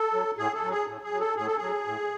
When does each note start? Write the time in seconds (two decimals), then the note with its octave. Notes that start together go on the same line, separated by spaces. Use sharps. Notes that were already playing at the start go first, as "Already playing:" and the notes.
Already playing: A4
0.13 F#3
0.38 A2 G#4
0.54 A4
0.63 F#3
0.71 G#4
0.87 A2
1.03 G#4
1.12 F#3
1.20 A4
1.37 A2 G#4
1.47 A4
1.56 G#4
1.61 F#3
1.86 A2